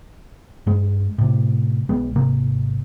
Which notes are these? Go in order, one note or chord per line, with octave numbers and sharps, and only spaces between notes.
G2 G#3
A2 C3
B1 G#3 B3
G#1 C3 A#3